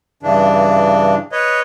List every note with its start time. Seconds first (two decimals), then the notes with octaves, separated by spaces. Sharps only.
0.23 G2 C#3 E3 D4
1.32 B4 C#5 D#5